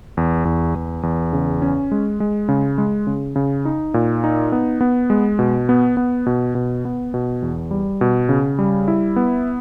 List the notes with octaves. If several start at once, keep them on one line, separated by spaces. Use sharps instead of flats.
E2
E2
E2
E2
C#3
C#4
G#3
G#3
C#3
G#3
C#3
C#3
D#4
A#2
D#4
B3
B3
G#3
B2
B3
B3
B2
B2
B3
B2
E2
G3
B2
C#3
G3
E4
B3